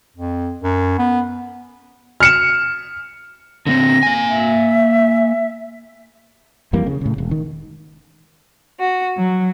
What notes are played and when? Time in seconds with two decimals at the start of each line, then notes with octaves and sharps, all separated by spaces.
0.16 F2
0.63 F#2
0.99 B3
2.20 F6 C#7 E7
3.67 D3 B3 C4 A#6
4.03 A#3 G#5
4.29 E5
6.73 F2 E3 G3 A#3
6.86 C#3
7.01 A2 C#3
7.18 E1
7.31 D#3
8.80 F#4
9.16 F#3